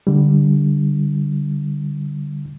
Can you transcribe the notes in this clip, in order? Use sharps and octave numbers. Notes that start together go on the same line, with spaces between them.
D3 G3